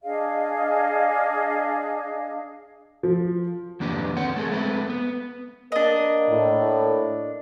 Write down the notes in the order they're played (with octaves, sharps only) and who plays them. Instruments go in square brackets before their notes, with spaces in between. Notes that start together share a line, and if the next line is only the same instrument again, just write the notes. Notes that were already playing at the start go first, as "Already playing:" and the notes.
[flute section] D4 G#4 D#5 F5
[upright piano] F3
[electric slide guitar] F2 D#3 A#3 D4 G4 B4
C4 C#5 F#5
A3 G#4 A#4
G#3 A3 C4 B4
B3
[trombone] A#3 [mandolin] D4 D#5
[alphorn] A2